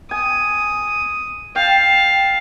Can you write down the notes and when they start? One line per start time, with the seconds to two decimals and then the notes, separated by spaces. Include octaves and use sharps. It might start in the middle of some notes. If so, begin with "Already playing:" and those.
0.11 G#5 D#6
1.56 F5 G5 A5